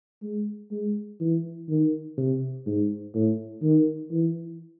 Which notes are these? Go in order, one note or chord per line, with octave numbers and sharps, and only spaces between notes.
G#3
G#3
E3
D#3
C3
G#2
A2
D#3
E3